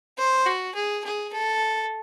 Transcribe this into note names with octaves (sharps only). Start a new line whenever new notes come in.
C5
F#4
G#4
G#4
A4